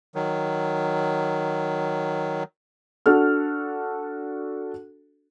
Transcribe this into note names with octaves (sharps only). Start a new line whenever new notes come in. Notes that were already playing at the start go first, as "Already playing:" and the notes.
D#3 F#3
D4 F#4 A4 F6